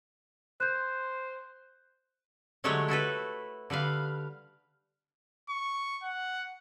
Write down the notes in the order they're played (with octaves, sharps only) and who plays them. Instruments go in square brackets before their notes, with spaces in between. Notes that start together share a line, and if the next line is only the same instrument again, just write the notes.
[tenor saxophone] C5 [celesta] F#6 G6
[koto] D3 F#3 G#3 A3 G4 C#5
E4 F#4 A4 B4
D3 G3 B4 F5
[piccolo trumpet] C#6
F#5